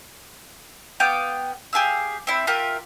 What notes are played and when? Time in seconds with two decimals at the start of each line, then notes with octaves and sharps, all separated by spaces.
1.00 B3 F5 G5 D6
1.73 G4 G#4 F5 E6
2.27 C4 E4
2.47 F4 G4 A#4 E5